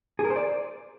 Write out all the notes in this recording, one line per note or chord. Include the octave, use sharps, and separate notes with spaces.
G#4
A#4
C5
D5